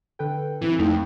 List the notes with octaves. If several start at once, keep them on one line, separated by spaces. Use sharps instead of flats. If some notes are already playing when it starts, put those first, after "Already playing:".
D3 A4 B4 G5
G2 E3 C4 E4
F2 A3 D#4 G5